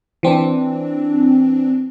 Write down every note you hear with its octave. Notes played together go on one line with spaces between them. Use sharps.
E3 C4 D4